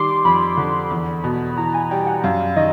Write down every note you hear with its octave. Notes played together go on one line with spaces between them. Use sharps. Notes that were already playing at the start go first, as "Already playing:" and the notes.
Already playing: D#3 G3 C6 D6
F2 B5
D3
E2
B2
E3 A#5
G#5
G3 G5
F#5
F#2 F5
D#3 D#5